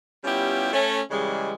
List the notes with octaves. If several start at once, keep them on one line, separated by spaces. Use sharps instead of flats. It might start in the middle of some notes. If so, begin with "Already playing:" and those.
G3 B3 C#4 E4 F4 G4
A3 C#4
C#3 E3 G3 G#3